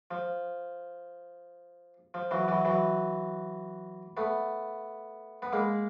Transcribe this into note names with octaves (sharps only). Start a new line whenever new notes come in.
F3
F3
E3 F#3
E3 F#3
E3 F#3
A3 B3
B3
G#3 A#3